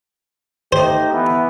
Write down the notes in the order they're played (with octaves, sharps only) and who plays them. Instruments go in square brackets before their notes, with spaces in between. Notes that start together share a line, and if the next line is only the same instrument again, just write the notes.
[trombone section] A3 D#4 G4 [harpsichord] C5
[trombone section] E3 B3